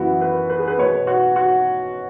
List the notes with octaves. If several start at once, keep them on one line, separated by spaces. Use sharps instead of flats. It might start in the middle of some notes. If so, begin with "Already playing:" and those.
Already playing: F#2 E3 B3 E4 F#4
B4
B4
G#4
B4
B2 B3 C#5
F#4
F#4